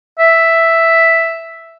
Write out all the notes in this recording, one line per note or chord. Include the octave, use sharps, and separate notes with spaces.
E5